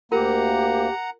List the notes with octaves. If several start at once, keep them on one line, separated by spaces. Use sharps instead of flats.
D2 A#3 F4 G4 A#4 F#5 A#5